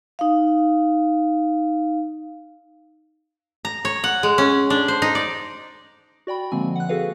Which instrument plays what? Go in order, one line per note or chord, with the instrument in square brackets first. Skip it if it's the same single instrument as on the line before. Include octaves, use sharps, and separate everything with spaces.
[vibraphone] D#4 F5
[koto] A#5
C#5
F#5
G#3
C#4
D4
C5
D#4
D5
[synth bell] F#4 D5 G5 B5
D3 F3 G#3 A#3 C4 G#5
F#5 F#6
F#4 G#4 A4 B4 F5